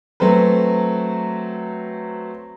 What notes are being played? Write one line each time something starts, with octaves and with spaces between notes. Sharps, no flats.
F#3 A3 C4 B4